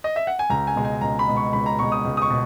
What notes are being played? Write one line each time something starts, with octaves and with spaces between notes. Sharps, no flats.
D#5
E5
F#5
G#5
C#2 A#5
G#5
B2 G#3
G#5
C#2 A#5
B5
B2 G#3
C#6
C#2 B5
A#5
B2 G#3 C#6
D#6
C#2
D#6
C#6
B2